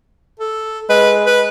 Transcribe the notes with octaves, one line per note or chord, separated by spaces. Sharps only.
A4
G#3 B4
B4